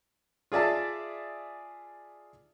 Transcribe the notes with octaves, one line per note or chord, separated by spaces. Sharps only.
F4 G#4 D5 E5 A5